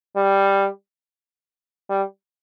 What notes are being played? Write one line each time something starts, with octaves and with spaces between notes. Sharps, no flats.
G3
G3